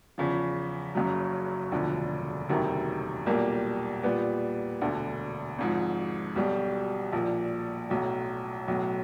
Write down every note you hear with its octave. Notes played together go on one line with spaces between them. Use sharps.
E2 C#3 F3
F#1 F#2 C#3 F#3
E1 D2 D3 F3
E1 D2 C3 D#3 F#3
B1 A#2 G3 A#3 D4
A#2 G3 B3
E1 D2 D3
G#1 G#2 F3
B1 B2 G3
A#1 A#2 F3
B1 A2 F#3
B1 A2 F#3